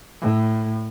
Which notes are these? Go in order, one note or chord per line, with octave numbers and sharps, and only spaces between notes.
A2